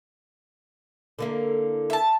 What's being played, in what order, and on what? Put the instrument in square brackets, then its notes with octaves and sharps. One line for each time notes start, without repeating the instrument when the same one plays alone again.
[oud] D3 A#3 E4
[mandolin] E5 A5